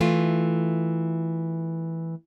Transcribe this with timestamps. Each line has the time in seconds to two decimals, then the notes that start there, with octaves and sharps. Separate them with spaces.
0.01 E3 A3 F4